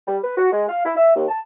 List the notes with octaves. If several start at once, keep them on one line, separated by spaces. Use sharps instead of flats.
G3
B4
F#4
G#3
F5
E4
E5
D#2
A5